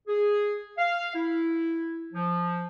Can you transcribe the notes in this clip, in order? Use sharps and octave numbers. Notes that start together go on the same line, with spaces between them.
G#4
F5
E4
F3